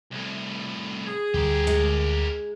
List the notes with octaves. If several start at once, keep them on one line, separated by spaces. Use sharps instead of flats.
C2 A2
G#4
D2 D3 G3 G4 A#4
G#3